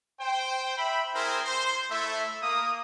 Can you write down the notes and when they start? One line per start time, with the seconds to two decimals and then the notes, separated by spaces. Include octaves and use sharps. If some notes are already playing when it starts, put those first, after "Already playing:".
0.21 C5 G5
0.77 E5 G5 B5
1.15 C4 E4 G#4 A#4 C5 G5
1.45 C5 C6
1.91 A3 E4 E5
2.43 A#3 D#6